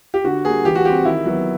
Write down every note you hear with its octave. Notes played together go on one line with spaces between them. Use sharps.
G4
D3 F#4
G3 A#3 G#4
E3 G4
F#4
G3 C4 G4
D#3 E4
F#3 B3